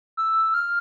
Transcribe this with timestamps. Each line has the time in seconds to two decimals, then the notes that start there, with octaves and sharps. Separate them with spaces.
0.17 E6
0.54 F6